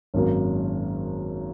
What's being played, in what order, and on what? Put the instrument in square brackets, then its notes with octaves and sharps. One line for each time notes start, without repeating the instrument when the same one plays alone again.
[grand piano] G#1 F#2 D#3 F#3 A#3